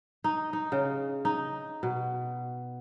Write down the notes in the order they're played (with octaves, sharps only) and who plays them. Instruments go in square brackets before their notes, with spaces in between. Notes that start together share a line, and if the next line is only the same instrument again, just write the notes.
[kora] D#4
D#4
C#3
D#4
B2